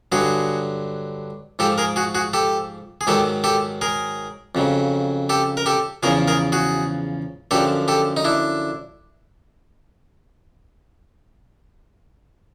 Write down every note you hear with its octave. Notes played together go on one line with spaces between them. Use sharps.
G2 D3 F#3 F#4 G#4
G#2 F3 G4 A4
G#4 A#4
F#4 G#4
F#4 G#4
G4 A4
G#4
G#2 D#3 F#3 G4 A4
G4 A4
G#4 A#4
F2 C#3 F#3
G4 A4
A#4
G4 A4
E2 C#3 F3 G#4 A#4
G#4 A#4
F#4 G#4
F#2 D3 F3 G4 A4
G4 A4
D#4
D4 E4